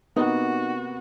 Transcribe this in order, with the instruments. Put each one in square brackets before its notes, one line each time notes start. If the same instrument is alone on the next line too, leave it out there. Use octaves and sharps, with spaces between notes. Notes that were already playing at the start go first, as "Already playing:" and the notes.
[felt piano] C3 A#3 B3 [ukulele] D#4 [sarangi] F#4